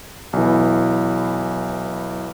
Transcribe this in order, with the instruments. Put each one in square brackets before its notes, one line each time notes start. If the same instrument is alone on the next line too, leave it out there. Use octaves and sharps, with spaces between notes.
[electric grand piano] B1 E3